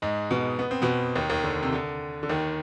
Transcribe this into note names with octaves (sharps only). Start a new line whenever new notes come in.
G#2 G#3
B2 B3
B3
C4
B2 B3
D#2 D#3
D#2 D#3
D3
C3
D3
D3
D#2 D#3